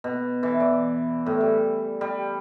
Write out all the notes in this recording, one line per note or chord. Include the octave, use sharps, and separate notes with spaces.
B2
E3
D5
A2
G3
G3